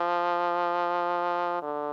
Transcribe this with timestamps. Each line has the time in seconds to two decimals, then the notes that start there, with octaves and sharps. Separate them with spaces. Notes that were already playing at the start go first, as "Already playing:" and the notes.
Already playing: F3
1.62 D3